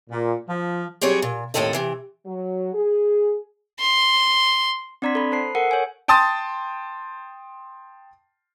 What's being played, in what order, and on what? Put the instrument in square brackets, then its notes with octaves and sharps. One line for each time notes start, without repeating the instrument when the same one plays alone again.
[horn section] A#2
F3
[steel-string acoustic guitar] F#3 G3 C4 G#4 C#5
A#2
D#2 A2 C3 C4 A4 D#5
C3 E3
[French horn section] F#3
G#4
[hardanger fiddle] C6
[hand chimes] C4 D4 D5 A#5 C6 B6
A4 B5
C5 A5 C7
A4 A#4 F#5 C#7
C#5 G#5
[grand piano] G5 A5 C6 D#6 A6